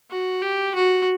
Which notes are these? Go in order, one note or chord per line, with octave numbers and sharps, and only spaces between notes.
F#4
G4
F#4